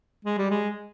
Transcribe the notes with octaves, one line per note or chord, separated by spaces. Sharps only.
G#3
G3
G#3